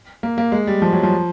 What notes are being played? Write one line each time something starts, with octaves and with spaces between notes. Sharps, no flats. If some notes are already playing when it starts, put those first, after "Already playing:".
A#3
A#3
G#3
G3
F3
F#3
F3